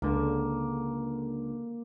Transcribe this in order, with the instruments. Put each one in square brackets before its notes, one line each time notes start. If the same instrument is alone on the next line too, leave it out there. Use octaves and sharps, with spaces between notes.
[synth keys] C#2 D3 [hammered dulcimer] A#3